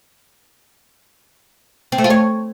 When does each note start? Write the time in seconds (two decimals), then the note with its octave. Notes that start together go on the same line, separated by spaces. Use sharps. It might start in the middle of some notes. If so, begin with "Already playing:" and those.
1.92 C4
1.98 A3
2.04 F4
2.10 C#5